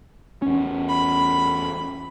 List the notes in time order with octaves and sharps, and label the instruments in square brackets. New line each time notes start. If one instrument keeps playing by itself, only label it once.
[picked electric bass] E2 C#4
[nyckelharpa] B5